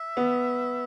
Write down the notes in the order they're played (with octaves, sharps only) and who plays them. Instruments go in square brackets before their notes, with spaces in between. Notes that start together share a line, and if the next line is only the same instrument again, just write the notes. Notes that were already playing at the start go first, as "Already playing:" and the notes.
Already playing: [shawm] E5
[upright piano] B3